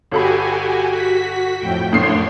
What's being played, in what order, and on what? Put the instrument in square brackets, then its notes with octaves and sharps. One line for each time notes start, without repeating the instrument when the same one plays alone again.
[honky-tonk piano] G1 A4 B5 [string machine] F#4 G4 G#5
[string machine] F#4 B6
F2 A2 G5
[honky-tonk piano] F#1 A2 C7 [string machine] D4 C#5 C6